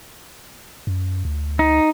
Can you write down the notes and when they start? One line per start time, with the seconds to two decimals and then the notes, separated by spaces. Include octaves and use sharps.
0.87 F#2
1.25 D2
1.59 D#4